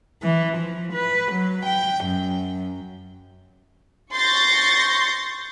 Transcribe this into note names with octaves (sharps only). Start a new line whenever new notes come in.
E3
F3
B4
F#3
G5
F#2
C6 C#6 G6 A6 A#6